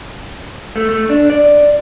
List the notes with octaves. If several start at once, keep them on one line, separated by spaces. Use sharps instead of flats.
A3
A3
D4
D5